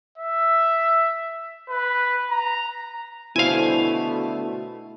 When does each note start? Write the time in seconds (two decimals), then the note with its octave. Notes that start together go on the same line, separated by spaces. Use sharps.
0.18 E5
1.69 B4
2.31 A#5
3.36 B2 D3 A3 E4 C5 F5 G#5